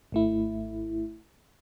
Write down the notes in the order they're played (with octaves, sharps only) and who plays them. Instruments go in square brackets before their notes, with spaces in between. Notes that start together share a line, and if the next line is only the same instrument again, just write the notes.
[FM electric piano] G#1 A3 E4